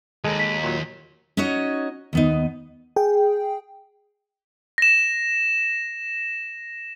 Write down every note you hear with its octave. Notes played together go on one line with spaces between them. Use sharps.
D#2 G#3 A4
B6
A#2 F#3
C#4 D#4 F#4 C#5 D#5
D#2 B3 D#4
G#4 G5
A#6 E7